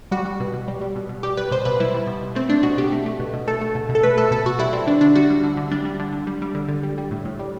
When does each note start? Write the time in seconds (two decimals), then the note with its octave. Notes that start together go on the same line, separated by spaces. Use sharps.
0.11 G3 F#4
0.25 G3
0.40 B2
0.54 B2
0.68 G3
0.81 G3
0.96 B2
1.09 B2
1.23 G3 G4
1.37 G3 B4
1.51 B2 C5
1.65 B2 B4
1.80 G3 E4
1.94 G3
2.07 B2
2.21 B2
2.35 A3 C4
2.49 A3 D4
2.63 B2 F#4
2.77 B2 G4
2.92 A3
3.06 A3
3.20 B2
3.34 B2
3.47 A3 A4
3.61 A3
3.75 B2
3.89 B2
3.95 A4
4.03 A3 B4
4.17 A3 A4
4.31 B2 A4
4.46 B2 F#4
4.59 G3 E4
4.73 G3 C4
4.87 D3 D4
5.01 D3 D4
5.15 G3 F#4
5.30 G3
5.44 D3
5.57 D3
5.71 G3 D4
5.85 G3
6.00 D3
6.13 D3
6.27 G3
6.42 G3
6.55 D3
6.69 D3
6.83 G3
6.98 G3
7.11 A2
7.25 A2
7.39 G3